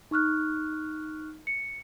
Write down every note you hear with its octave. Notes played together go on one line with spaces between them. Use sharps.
D#4 C#6 F6 F#6
C#7